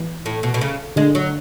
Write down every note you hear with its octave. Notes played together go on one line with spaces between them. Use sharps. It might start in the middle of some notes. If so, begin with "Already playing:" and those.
Already playing: E3
A2
B2
B2
C#3
D3 G#3
F#3